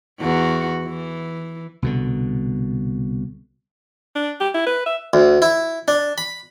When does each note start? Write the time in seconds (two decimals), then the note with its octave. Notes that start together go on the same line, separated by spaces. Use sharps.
0.21 E2 F#4
0.84 E3
1.82 C2 B2 D3
4.16 D4
4.40 G4
4.54 E4
4.66 B4
4.86 E5
5.13 D2
5.42 E4
5.88 D4
6.18 B5